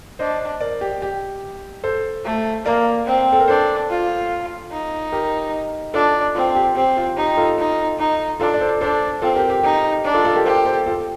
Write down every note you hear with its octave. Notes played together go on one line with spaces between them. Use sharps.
D4 C5 D#5
A#4 D5
G4
G4
A4 C5
A3
A#3 A#4 D5
C4
A4
A#4
D4 A4 C5
F4
D#4
G4 A#4
D4 F4 A4
C4 F4
G4
C4 G4
F4
D#4 G4
F4 A4
D#4
D#4
D4 F4 A4
D5
A4 C5
D4 A4 C5
C4 F4 A4
G4 A#4
G4
D#4 G4
D4
F4 A4
F4 A4
G4 A#4
G4 A4 C5
A4 C5
F4 A4